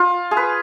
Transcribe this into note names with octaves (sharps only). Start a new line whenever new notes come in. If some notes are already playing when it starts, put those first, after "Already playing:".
Already playing: F4
G#4
B4